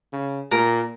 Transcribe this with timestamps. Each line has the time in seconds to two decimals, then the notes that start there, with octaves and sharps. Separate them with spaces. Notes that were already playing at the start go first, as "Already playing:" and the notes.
0.12 C#3
0.51 A#2 A#4